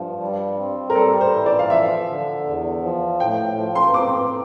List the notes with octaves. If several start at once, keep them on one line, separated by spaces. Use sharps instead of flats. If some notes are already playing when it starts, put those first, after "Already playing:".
Already playing: G2 F3
G3
C4
A#4
G3 A4
C5
E3
D5
F5
F3 E5
D3
E2
F3
A2 G5
F3
C6
C4 D6